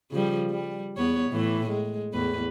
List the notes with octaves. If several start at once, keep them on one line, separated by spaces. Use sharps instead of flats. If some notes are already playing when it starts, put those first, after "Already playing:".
C#3 F3 G3
G3
E2 B3 C#5
A2 E3
G#3
E2 A2 B4